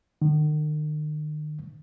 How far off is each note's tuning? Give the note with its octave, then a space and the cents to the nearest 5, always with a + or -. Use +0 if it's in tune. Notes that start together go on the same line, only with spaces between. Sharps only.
D#3 -40